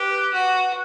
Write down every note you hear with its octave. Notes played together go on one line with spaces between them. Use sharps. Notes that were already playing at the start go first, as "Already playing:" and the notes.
Already playing: G4 B4
F#4